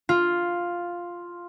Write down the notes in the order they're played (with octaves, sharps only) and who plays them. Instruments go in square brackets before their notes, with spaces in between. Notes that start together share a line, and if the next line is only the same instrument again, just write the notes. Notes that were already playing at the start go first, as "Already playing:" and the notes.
[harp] F4